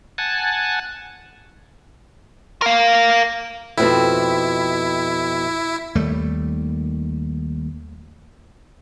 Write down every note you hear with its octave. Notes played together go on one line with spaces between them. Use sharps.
F#5 G#5 A5
A#4 F5
F2 B2 C4 E4
D#2 G3 A3